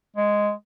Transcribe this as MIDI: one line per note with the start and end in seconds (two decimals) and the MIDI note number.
0.16 0.51 56